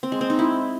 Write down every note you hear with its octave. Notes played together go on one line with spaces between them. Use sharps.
C4
G#3
C4
D#4
E4